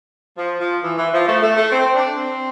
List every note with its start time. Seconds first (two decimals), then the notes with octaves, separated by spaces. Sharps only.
0.37 F3
0.60 F3
0.83 E3
0.97 E3
1.13 F3
1.28 A3
1.42 A3
1.56 A3
1.72 C4
1.95 D4
2.17 C4